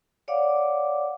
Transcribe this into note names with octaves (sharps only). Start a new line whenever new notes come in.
C#5 D5 F5 F#5 D6